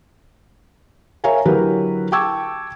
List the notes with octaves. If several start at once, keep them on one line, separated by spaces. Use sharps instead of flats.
A#4 C#5 E5 F5 G#5 A#5
D3 F#3 E4 G4 A#4 B4
G5 A5 C#6 D6 E6 G#6